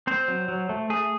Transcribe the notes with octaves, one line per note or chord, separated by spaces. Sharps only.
C4 C5
F#3
F#3
A3
A3 G#4